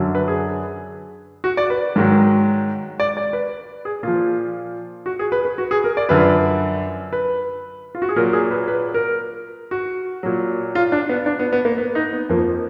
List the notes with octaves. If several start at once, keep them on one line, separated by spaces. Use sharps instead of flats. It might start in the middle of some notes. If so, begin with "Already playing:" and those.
Already playing: F#2 D3 F#3
B4
G#4
F#4
D5
B4
G#2 D#3 F#3
D5
D5
B4
G#4
A#2 F3 F4
F#4
G#4
B4
B4
F#4
G#4
A#4
D5
F#2 D3 F3 B4
B4
F4
F#4
G#4
A#2 F#3 A#4
G#4
B4
B4
A#4
F#4
A#2 F#3
F4
D4
B3
D4
B3
B3
A#3
B3
D#4
B3
F2 F3 A#3